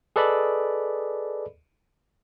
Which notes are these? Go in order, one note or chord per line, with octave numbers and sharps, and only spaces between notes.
G#4 A4 B4 D5 D#5 B5